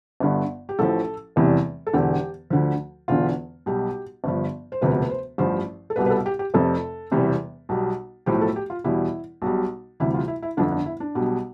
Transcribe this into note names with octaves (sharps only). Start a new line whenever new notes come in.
G1 G2 D3
G4
A1 A2 F3 A4
F1 E2 C3 E3 G3
A4
E1 E2 D3 G4
D2 D3 F3
E1 E2 D3 F4
B1 B2 G3 G4
G1 G2 F3
C5
E1 D2 C3 F3 B4
B4
C5
A1 G2 F3 C5
A4
C2 B2 G3 B4
B4
A4
G4
G4
F1 F2 C3 F3 A4
E1 E2 C3 E3 G3
B1 B2 G3
B1 A2 F3 G4
A4
G4
F4
E2 B2 G3 E4
B1 B2 G3
D2 C3 E3 G3 E4
F4
E4
E4
G1 F2 D3 D4
D4
E4
D4
B1 B2 G3